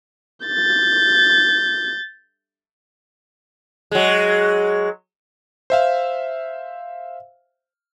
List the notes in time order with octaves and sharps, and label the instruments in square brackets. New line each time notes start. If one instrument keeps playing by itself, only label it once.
[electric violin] G6 A6
[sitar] F#3 G#3
[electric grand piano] C5 E5 F5